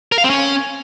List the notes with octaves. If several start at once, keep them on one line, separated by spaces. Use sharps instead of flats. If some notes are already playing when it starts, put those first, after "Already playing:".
A#4
F5
C4
C#4